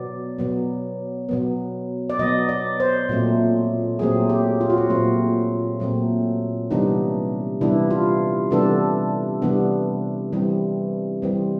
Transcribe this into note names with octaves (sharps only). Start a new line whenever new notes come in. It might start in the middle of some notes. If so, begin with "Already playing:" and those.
Already playing: B2 F#3 B3 D5
B2 F#3 B3
B2 F#3 B3
D5
B2 F#3 B3 D#5
D5
C5
A#2 F#3 A3 C4
A#2 F#3 A3 C4 G#4
G4
F4
F#4
F4
A#2 F#3 A3 C4
A#2 F#3 A3 C4
C3 E3 G3 B3 D4 D#4
C3 E3 G3 B3 D4 E4
F4
C3 E3 G3 B3 D4 A4
C3 E3 G3 B3 D4
E3 G3 C4
E3 G3 C4